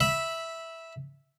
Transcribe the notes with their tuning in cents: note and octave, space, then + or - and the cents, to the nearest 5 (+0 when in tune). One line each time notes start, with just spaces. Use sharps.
E5 -5 B5 -10